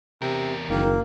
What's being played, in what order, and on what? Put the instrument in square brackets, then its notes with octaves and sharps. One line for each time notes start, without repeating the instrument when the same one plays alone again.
[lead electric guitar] E2 A#4 [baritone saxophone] C3
[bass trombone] F#1 [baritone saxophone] D#3 [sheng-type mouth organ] A#3